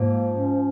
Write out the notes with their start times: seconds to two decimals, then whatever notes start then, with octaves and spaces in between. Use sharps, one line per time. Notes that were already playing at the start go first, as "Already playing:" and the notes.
Already playing: G#2 F3 A#3
0.34 C#4